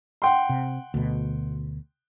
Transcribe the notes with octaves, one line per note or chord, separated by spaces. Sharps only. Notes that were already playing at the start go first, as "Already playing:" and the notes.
F#5 G5 C6
C3
D2 B2